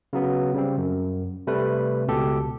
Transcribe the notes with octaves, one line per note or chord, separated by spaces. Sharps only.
C#3 F#3 B3
C#3 G3 C4
F#2
C3 G3 A3 B4
C#2 B2 G4 A4